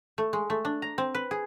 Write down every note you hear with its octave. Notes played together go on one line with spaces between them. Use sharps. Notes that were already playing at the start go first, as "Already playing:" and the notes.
A3
G#3
A3
D4
A#5
C4
B4
G#4